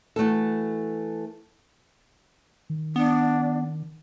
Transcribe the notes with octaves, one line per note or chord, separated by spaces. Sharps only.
E3 A3 F#4 A4
D#3
B3 D4